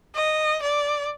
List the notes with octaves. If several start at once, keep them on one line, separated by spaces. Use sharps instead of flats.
D#5
D5